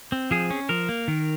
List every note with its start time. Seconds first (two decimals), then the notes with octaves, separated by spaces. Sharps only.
0.12 C4
0.31 F3 G#4
0.50 C#4
0.69 F3 A#4
0.89 A#3
1.08 D#3